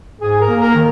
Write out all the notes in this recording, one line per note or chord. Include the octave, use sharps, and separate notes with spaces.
G#2 G#4
A#4
A#3
A#4
D#3